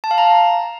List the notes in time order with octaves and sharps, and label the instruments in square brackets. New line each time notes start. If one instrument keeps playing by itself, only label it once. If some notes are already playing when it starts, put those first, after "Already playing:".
[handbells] A5
F5
A#5